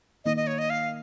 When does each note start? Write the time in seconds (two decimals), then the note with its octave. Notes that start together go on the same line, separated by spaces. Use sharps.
0.25 D#3 A#3 D#4 D#5
0.37 D#5
0.47 C#5
0.58 D#5
0.70 F5